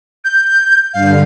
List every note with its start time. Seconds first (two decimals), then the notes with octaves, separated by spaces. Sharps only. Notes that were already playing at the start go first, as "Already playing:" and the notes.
0.25 G6
0.94 G2 D3 F5